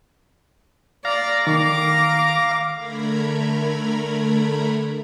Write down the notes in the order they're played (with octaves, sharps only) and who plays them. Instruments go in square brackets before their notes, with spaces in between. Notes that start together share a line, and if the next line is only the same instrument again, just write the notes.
[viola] D5 [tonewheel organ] F5 A#5
[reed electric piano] D#3 [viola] D6
[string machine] D3 A3 A#4 A#5 B5 G#6